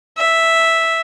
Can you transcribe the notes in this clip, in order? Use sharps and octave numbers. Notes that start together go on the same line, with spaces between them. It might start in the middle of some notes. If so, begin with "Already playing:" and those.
E5